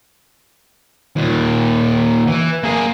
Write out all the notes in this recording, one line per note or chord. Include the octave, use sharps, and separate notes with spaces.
D#2 A#2
E3
A#3 G#4